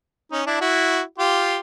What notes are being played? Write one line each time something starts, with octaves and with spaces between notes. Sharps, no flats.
C#4 D#4
D4 E4
E4 F#4
F4 G4